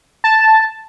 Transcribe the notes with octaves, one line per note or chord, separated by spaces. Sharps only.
A5